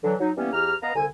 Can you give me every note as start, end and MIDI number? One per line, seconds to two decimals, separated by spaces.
0.04 0.15 50
0.04 0.15 52
0.04 0.15 54
0.20 0.31 54
0.20 0.31 63
0.38 0.50 52
0.38 0.50 55
0.38 0.50 58
0.38 0.50 59
0.38 0.50 61
0.53 0.75 40
0.53 0.75 52
0.53 0.75 67
0.53 0.75 82
0.53 0.75 89
0.82 0.92 59
0.82 0.92 71
0.82 0.92 75
0.82 0.92 77
0.82 0.92 82
0.96 1.06 36
0.96 1.06 50
0.96 1.06 80